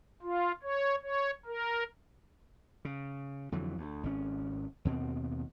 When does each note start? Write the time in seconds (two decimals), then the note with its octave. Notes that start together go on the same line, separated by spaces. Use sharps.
0.22 F4
0.63 C#5
1.02 C#5
1.46 A#4
2.85 C#3
3.52 F2 D3 E3 F#3
3.78 D2
4.03 G#1 B2 C#4
4.85 D#2 B2 C4